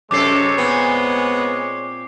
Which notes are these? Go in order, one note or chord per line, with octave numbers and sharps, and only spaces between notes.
F#2 C3 G#3 A4 C#5 D6 C7
A#2 B3 C4